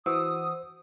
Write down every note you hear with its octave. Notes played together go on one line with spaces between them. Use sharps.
E3 F#4 C5 D#6 E6